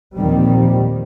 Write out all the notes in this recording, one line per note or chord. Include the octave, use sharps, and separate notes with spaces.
D#2 A#2 D#3 F3 G3 C4